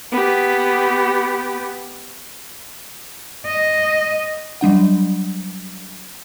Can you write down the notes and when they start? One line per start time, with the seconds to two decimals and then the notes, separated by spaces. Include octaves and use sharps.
0.12 B3 G4
3.46 D#5
4.61 F#3 G3 D4 F#5